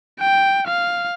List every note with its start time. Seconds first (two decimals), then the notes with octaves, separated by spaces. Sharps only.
0.20 G5
0.66 F5